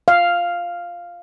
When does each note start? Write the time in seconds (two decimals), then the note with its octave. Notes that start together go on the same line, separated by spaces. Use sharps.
0.08 F5